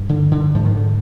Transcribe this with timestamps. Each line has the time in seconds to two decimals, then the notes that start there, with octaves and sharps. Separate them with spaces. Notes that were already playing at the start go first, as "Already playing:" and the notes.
Already playing: G2
0.09 D3
0.31 D3
0.55 G#2 F3
0.65 D#3
0.76 D3